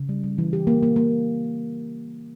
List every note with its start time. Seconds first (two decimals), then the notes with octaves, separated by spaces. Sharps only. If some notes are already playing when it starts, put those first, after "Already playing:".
Already playing: C#3
0.09 G3
0.24 G3
0.38 E3
0.53 G4
0.67 A#3
0.83 A#3
0.96 A#3